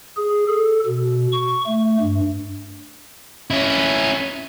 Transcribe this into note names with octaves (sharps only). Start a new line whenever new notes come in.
G#4
A4
B2
C#6
A3
G2
C#4 E4